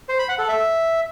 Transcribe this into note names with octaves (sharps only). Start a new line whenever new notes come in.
C5
B5
F#5
A4
E5